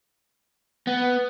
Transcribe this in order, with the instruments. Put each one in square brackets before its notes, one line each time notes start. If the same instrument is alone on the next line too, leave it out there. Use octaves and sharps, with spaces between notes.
[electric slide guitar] B3